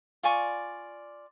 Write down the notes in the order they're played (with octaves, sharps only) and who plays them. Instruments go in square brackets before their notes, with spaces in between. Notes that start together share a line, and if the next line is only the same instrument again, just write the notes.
[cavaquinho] F4 D5 G#5 C#6